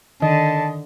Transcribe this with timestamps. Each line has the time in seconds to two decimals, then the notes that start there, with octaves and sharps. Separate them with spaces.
0.22 D3 D#3 D#5 A5